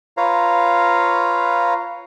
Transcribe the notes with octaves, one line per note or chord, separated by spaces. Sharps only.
F4 B4 C#5 F5 A#5